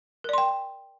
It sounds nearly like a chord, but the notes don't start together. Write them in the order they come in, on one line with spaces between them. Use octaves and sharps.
A#4 D5 C6 G5